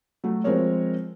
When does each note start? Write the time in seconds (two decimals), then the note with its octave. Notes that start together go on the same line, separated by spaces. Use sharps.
0.24 F#3 A3
0.44 F3 G#3 C4 A#4 C#5